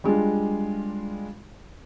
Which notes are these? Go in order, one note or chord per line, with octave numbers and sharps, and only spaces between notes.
G3 G#3 D4 F4